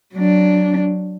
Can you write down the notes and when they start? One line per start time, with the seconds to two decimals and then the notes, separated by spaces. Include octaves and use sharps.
0.15 F#3 D4